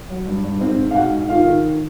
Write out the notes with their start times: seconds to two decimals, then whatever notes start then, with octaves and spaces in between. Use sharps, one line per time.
0.09 F#3
0.26 G2
0.44 G2
0.61 G#2 C4 C5
0.78 G#2
0.91 F5
0.94 G#2 F#4 F#5
1.13 G#2
1.29 D#3 F4 F5
1.47 D#3